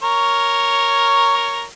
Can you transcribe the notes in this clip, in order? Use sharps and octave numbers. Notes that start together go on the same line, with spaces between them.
A#4 C#5